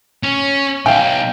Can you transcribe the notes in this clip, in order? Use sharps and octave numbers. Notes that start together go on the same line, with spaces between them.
C#4
B1 F5 G5